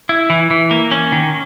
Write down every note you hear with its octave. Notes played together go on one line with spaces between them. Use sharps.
E4
E3
E3
A#3
C#4
D#3